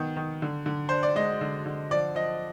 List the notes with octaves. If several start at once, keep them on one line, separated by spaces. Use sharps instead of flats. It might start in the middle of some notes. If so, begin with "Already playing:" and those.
Already playing: D#3 B3
D#3
D3
D3
D4 C5
D5
G#3 D#5
D3
D3
F3 D5
F3 D#5